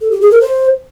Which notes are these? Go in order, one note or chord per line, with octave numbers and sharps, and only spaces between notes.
A4
G4
G#4
A#4
C5